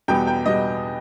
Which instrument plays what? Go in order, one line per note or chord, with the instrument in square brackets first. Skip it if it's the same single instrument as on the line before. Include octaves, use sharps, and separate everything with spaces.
[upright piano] E2 B2 G3 B3 G5
G5
B2 G3 B3 D#5